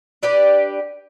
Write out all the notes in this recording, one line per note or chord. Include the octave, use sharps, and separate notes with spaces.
D4 G4 B4 D5